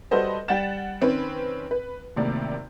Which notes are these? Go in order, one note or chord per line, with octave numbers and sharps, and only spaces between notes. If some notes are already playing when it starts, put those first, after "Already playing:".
G3 F#4 A4 B4 C5 D#5
G3 F#5 G5 A6 E7
D#3 C4 C#4 B4
B4
G#1 A2 C3 A#3 D5